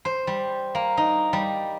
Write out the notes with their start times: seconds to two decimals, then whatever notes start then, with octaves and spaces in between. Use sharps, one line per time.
0.05 C5
0.27 G3
0.75 A#3
0.97 D#4
1.33 G3